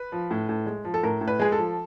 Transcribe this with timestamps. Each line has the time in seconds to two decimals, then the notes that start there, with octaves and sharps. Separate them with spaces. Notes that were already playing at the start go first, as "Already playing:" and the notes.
Already playing: B4
0.12 F3
0.31 A2
0.49 A2
0.66 G#3
0.85 F3
0.94 A4
1.03 A2 A#4
1.21 A2
1.28 B4
1.40 G#3 G#4
1.52 A4
1.58 F3